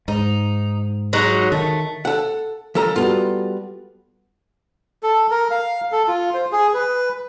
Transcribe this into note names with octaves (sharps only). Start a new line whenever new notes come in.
G#2 D#4
F#3 G#3 D#4
D#3 A3
A4 F#5
F3 A4 A#5
G3 B3 F4 F#4 A4
A4
A#4
F5
A4
F4
C5
G#4
B4